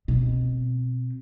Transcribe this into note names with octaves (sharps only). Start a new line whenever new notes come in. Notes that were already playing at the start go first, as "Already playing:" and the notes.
B2 C4